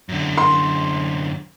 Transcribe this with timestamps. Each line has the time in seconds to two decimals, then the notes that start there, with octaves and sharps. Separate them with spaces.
0.09 F#2 D3
0.38 C6